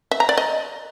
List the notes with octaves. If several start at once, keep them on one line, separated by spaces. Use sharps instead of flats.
E5
A#5
D5
D#5